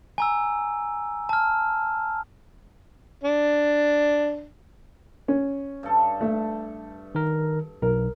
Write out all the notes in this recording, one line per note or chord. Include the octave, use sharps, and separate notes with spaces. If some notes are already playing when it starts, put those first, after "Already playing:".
G#5 A#5 E6
A5 F6
D4
C#4
G2 A4
A3
D#3 A#4
B1 A#4